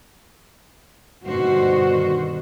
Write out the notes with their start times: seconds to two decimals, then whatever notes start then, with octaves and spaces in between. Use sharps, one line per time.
1.25 G2 B2 D3 D#3 F#4 C5